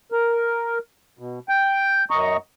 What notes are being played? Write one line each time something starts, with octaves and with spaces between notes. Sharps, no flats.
A#4
B2
G5
F#2 D#5 A#5 C#6